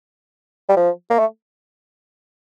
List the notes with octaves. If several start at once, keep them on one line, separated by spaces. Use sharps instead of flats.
G3
F3
A#3
A3